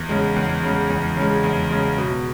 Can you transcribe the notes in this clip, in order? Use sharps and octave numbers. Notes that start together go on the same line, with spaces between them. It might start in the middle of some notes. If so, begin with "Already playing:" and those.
Already playing: E2
C#3 G#3
E2
C#3 G#3
E2
C#3 G#3
E2
C#3 G#3
B2